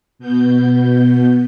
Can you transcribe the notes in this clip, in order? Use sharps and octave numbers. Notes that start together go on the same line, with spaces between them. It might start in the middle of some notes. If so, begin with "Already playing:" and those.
B2 B3 G6